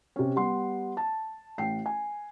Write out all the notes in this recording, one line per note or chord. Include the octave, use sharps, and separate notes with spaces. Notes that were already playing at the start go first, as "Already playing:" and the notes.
C3 C#4
G3 B3 C6
A5
A1 G5 C7
G#5